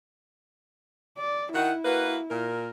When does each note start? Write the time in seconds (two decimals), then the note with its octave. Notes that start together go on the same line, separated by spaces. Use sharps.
1.18 D5
1.54 D#3 E4 F#5
1.84 A#3 F#4 B4
2.30 A#2 A#4